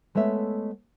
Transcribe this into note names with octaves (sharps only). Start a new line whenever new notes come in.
G#3 A3 B3 C#5 E5